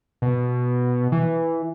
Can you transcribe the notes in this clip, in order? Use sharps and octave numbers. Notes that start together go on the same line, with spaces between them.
B2
E3